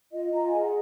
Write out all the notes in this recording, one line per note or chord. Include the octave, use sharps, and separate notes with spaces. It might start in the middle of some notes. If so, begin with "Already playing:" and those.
F4 D#5
F4 A#5
G#5
G#4
F#5